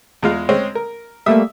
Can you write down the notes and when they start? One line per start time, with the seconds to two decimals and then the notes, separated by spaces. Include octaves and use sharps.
0.23 E2 G#3 F4
0.49 G#3 C4 C#4
0.75 A#4
1.26 G3 A3 A#3 E5 D#6